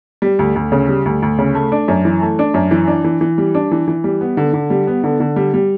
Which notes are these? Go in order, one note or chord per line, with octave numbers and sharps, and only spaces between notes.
G3
D2
D2
C#3
G3
D2
D2
C#3
A3
D4
F#2
E3
A3
D4
F#2
E3
D4
E3
E3
G3
D4
E3
E3
G3
B3
D3
D3
G3
B3
D3
D3
G3
G3